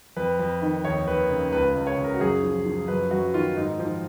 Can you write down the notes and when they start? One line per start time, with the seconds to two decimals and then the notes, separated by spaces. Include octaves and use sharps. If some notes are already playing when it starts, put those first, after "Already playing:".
0.16 F2 B4
0.39 F2
0.62 D#3
0.85 D#2 C#5
1.07 D#2 B4
1.30 C#3
1.53 C#2 B4
1.69 B4
1.75 C#2
1.87 C#5
1.98 C#3
2.04 A#4
2.14 F#4
2.20 F#2 G#4
2.43 F3
2.65 F3
2.88 F#2 B4
3.11 F#2 F#4
3.34 D#3 F4
3.57 G#2 D#4
3.79 F3